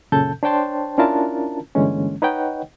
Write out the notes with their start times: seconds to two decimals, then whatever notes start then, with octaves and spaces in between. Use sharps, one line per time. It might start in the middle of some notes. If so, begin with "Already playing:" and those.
0.12 F#2 A#2 C#3 A4 A5 G6
0.43 D4 C5 C#5 G5 A5 C6
0.98 C#4 D4 E4 F4 A#4 A5
1.75 G2 D3 E3 G#3 A#3 C#4
2.22 D#4 B4 C#5 D#5 F#5 G5